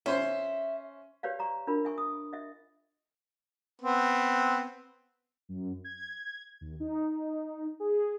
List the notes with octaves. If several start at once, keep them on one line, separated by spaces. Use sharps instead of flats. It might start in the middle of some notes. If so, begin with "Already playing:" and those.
C#4 C5 E5 C6
G4 B4 C#5 D5 F5
D5 A#5 C#6
D4 F4 A#4 B5
E5 G#5 C#6
D#6
D#5 E5
B3 C4
F#2
G#6
D#2
D#4
G#4